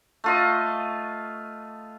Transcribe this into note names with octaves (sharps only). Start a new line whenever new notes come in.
A3 F4 D#5